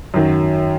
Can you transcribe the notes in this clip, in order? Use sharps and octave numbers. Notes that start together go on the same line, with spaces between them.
F#2 D#3 F#3